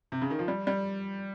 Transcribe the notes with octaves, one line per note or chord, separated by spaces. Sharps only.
C3
C#3
D#3
F3
G3
G3